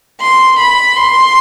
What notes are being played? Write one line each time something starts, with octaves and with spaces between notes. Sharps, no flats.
C6
B5
C6